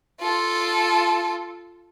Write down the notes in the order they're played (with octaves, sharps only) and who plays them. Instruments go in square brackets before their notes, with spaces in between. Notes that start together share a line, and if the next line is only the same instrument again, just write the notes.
[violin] F4 A4